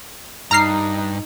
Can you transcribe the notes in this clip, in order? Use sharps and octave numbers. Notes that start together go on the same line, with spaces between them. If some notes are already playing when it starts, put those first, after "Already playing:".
G2 D#4 A#5 F6 C7